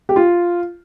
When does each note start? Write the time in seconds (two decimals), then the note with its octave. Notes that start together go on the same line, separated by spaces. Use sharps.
0.09 G4
0.16 F4